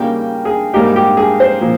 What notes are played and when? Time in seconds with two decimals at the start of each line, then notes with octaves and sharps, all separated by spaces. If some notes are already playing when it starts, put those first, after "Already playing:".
Already playing: C#3 G3 A#3 D#4 G5
0.45 G#4
0.74 G#2 G3 A#3 D#4 G4
0.96 G4
1.17 G#4
1.40 C5
1.61 A#2 F3